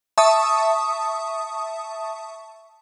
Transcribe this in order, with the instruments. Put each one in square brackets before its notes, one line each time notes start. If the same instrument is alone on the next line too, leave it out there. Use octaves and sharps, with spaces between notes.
[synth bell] E5 A5 C#6 D#6